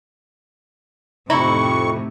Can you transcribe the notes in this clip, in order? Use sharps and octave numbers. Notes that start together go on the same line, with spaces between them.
F2 A2 C3 D#4 E4 E5 B5 C#6